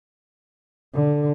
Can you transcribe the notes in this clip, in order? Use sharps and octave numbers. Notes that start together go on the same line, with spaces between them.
D3